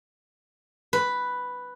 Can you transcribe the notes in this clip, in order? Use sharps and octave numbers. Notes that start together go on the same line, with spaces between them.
B4